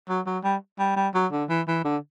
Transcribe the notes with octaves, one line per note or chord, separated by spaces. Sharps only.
F#3
F#3
G3
G3
G3
F#3
D3
E3
E3
D3